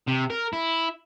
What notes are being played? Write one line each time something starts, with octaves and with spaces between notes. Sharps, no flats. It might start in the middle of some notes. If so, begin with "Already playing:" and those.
C3
A#4
E4